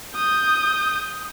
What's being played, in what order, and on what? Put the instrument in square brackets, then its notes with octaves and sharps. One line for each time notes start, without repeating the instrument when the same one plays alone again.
[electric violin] D#6 G6